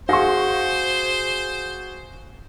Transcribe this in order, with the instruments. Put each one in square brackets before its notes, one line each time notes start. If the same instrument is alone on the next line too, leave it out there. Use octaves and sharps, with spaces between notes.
[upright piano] F#4 G#4 A#6 [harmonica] C5 [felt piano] F5 C#6